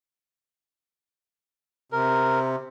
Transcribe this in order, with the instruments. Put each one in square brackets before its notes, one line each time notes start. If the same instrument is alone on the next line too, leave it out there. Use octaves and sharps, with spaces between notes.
[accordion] C3 [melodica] A#4